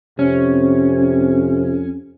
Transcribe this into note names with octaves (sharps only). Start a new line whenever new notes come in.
F2 C3 C#4